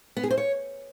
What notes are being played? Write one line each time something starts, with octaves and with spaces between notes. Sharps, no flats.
B3
G#4
C5
C#5